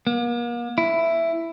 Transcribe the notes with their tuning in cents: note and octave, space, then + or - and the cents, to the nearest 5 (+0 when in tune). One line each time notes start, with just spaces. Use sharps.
A#3 +40
E4 +10